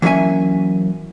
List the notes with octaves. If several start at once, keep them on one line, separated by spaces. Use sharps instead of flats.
E3 F#3 A#3 C#4 E5 G#5